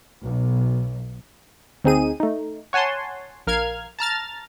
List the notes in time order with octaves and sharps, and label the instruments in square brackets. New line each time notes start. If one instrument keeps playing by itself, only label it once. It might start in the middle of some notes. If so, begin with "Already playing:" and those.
[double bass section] B1
[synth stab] D2 C4 D#4 G#4 D#7
A3 D#4
C#5 F#5 G#5 A5 C6
A#1 A#4 F5 F6 G#6
A5 A#5 F6 A6